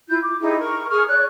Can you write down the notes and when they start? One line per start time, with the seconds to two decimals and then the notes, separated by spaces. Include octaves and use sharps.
0.08 E4 F4 G6
0.23 D6
0.40 D#4 E4 G4 G#4
0.58 A#4 C#6
0.90 G#4 C#6 D#6 F6
1.08 C#5 D5 F#6